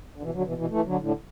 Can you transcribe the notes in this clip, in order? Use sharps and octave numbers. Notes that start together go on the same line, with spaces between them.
D3
B2 E3
D3 F#3
B2 E3
B2 E3
E3 A3
D3 F#3
A2 D3